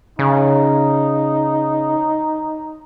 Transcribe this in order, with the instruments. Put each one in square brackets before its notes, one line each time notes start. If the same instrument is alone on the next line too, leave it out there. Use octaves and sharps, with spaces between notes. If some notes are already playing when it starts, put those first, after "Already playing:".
[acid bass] C#3 [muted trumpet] D#4